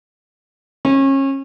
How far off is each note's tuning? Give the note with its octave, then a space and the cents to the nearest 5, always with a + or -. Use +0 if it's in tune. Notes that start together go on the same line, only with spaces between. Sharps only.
C#4 -30